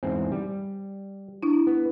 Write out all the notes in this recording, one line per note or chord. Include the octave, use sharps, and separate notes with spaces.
E2 G#2 C4
G3
D4 E4
B3